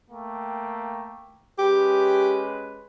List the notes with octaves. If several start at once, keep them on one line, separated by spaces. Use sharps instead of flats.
A3 A#3 G5
G#3 C#4 G4 B4